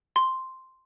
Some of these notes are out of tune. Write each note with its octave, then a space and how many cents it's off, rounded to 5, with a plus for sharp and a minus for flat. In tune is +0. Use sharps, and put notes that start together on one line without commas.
C6 +0